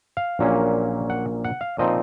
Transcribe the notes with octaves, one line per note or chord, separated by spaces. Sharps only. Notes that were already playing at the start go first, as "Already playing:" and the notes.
F5
A#1 A#2 F#3 A#3 C#4
F#5
F#5
F5
A#2 F3 C4 D#4 D#5